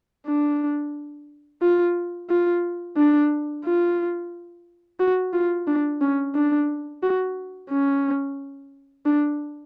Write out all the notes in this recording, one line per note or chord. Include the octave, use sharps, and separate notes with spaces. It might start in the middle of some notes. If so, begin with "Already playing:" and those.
D4
F4
F4
D4
F4
F#4
F4
D4
C#4
D4
F#4
C#4
D4